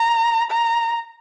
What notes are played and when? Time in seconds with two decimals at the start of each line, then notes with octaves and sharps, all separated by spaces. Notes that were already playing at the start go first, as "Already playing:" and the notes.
Already playing: A#5
0.50 A#5